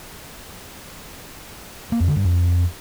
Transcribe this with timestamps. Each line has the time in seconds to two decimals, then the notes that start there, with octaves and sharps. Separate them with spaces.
1.92 A#3
2.00 F2
2.08 D3
2.16 G2
2.24 F2